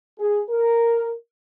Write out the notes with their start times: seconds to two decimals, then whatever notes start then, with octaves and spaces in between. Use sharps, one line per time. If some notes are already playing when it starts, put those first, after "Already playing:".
0.19 G#4
0.50 A#4